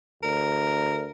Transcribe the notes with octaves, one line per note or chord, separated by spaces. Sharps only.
D2 A#4